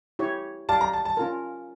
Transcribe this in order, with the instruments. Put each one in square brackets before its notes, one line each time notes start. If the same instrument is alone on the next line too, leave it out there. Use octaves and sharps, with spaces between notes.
[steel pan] E4 G4 C#5
[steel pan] G4 D5 F5 [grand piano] A5
[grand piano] A#5
A5
A5
[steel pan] C#4 F4 A#4